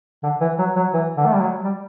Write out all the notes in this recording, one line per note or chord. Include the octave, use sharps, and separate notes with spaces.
D3
E3
F#3
F#3
E3
D3
A3
G3
F#3
G3